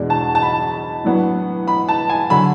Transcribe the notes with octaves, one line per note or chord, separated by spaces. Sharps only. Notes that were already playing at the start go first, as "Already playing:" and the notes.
Already playing: E2 B2 G#3 D4
A5
A5
B5
A2 F#3 B3 D4
B5
A5
G#5
D3 F#3 B5